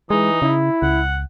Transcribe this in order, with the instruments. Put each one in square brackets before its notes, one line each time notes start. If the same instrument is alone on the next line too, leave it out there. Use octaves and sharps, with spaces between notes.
[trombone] E3 [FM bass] G#3 [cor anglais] D#4
[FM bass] C#3 [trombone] E4
[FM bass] C#2 [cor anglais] F#5